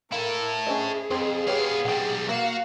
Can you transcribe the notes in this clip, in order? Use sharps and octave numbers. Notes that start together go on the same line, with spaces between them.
E4 A4 A#4 F5
C#4 G#4 C5 D#5
F2 C4 C5
B3 G4 B4 C#5 F5
B1 G3 F#5 G5
A#3 F#4 F5